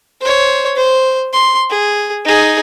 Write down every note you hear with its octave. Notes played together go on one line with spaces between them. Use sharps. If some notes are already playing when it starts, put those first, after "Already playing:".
C5 C#5
C5
C6
G#4
D#4 G#4